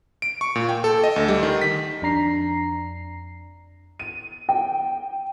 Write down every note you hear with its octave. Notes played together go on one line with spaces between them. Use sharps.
D7
C#6
A#2
G5
A4
D#5
D2
G3
D#3
B6
F2 D4 A#5 C7
D#7
G5